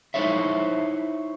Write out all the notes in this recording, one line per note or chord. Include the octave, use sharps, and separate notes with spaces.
D#4 E4 C5 C#5 E5